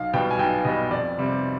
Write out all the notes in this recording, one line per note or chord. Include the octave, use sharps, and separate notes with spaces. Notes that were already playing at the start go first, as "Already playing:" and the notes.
Already playing: B1 F5
B2 G3 B3 G5
G#5
B1 G5
B2 G3 B3 D#5
F2 D5
C3 G3 C4